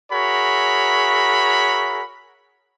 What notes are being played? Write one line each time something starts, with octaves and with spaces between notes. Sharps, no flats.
F#4 G#4 A#4 C#5 E5 B5